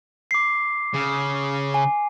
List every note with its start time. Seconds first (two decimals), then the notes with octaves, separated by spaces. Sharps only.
0.31 D6 C7
0.94 C#3
1.74 G#5